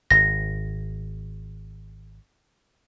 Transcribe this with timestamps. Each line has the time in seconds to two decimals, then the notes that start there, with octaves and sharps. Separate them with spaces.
0.11 G#1 A#6